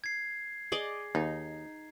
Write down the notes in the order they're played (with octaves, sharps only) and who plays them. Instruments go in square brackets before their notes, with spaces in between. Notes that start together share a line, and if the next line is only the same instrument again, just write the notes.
[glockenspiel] G#6 C7
[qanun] G#4 D5 D#5
[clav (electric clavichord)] D#2 [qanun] D#4